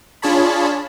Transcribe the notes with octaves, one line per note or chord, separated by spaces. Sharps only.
D4 F4 G#4 C#5 A5 B5